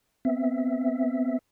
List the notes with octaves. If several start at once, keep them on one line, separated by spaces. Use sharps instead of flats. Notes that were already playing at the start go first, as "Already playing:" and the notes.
B3 C4 E5